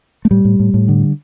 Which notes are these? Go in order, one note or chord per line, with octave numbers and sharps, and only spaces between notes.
A3
A2 G3
A2
A2
A2
D3